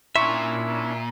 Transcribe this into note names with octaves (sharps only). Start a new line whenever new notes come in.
A#2 C#4 D4 E4 E5 C6 C#6